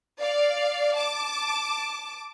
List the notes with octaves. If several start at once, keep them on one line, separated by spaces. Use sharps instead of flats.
D5 F5
A5 D6